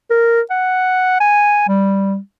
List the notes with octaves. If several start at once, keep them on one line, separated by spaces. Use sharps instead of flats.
A#4
F#5
G#5
G3